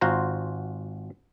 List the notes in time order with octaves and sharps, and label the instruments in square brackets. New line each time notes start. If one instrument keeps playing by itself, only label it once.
[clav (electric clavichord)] G#1 F4 F#4 C5 A#5